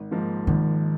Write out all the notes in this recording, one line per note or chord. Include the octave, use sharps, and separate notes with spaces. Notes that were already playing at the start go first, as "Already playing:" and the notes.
Already playing: G#1
G#2 F3 A#3 D#4
G#1 D#3